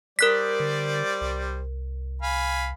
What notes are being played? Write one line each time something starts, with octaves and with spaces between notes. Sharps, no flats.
G3 A#4 C5 D5 F#6 B6
D3
C2
F5 G#5 B5